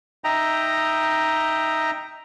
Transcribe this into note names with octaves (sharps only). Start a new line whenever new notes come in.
D#4 D#5 E5 G5 A#5